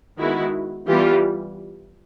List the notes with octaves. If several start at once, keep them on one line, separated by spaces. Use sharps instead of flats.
D#3 G#3 B3 E4 F#4
E3 G3 B3 F4 G4